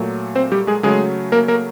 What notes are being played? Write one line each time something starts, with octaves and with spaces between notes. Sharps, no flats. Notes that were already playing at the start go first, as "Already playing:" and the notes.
Already playing: A#2 F#3 A3
C4 C5
G3 G4
G#3 G#4
C#3 F#3 G#3 A3 G#4
A#3 A#4
A#3 A#4